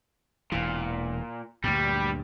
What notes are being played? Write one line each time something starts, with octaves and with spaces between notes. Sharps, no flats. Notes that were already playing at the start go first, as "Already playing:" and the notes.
E1 A#2 E3
D2 G2 A#2 G3